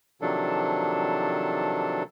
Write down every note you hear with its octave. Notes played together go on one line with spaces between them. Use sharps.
C3 D#3 F3 F#3 D4 A4